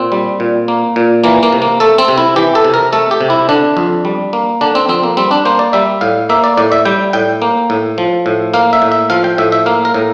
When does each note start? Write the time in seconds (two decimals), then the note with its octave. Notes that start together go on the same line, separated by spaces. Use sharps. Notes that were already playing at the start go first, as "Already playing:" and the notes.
Already playing: A#2 C4
0.12 G3
0.40 A#2
0.68 A#3
0.96 A#2
1.24 E3 A#3
1.43 A#3
1.52 C3
1.62 A#3
1.80 A3 A4
1.98 C4
2.08 C3
2.18 E4
2.36 E3 G4
2.55 A4
2.64 C3
2.74 A#4
2.93 A3 A4
3.11 G4
3.21 C3
3.30 E4
3.49 D3 D4
3.77 F2
4.05 G3
4.33 A#3
4.61 D3 D4
4.75 C4
4.89 F2 C4
5.03 A#3
5.17 G3 C4
5.31 D4
5.45 A#3 C5
5.59 D5
5.73 G3 E5
6.01 A2 F5
6.29 A#3 E5
6.44 D5
6.57 A2 D5
6.72 E5
6.85 G3 G5
7.13 A2 G5
7.42 A#3
7.70 A2
7.98 F3
8.26 A2
8.54 A#3 F5
8.73 E5
8.82 A2
8.92 E5
9.10 F3 F5
9.24 G5
9.38 A2 E5
9.52 E5
9.66 A#3 F5
9.85 A#4
9.94 A2